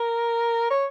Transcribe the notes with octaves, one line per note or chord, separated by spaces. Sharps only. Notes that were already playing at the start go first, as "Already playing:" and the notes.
Already playing: A#4
C#5